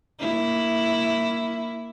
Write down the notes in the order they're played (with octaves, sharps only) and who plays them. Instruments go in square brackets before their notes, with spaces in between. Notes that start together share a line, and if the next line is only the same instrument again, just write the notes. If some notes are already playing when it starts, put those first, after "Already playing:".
[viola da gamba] A#3 E4